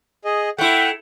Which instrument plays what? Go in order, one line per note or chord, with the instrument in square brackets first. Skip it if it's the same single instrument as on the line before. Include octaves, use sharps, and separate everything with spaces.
[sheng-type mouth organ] G#4 D#5
[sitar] A3 E4 [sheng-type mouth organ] F#5 G5